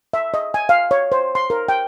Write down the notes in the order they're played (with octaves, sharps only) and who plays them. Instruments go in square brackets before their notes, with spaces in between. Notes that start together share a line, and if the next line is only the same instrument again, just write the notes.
[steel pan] E5
D#5
G#5
F5
C#5
C5
C6
A#4
G5